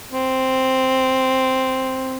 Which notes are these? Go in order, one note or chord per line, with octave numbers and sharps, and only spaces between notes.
C4